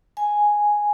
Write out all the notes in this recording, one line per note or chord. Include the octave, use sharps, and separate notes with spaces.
G#5